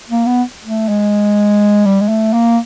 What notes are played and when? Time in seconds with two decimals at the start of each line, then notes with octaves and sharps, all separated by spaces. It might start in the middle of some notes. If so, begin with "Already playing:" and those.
0.10 A#3
0.26 B3
0.65 A3
0.89 G#3
1.86 G3
2.01 G#3
2.08 A3
2.33 A#3